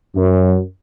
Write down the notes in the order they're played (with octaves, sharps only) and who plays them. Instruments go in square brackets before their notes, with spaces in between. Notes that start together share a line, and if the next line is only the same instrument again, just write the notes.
[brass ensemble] F#2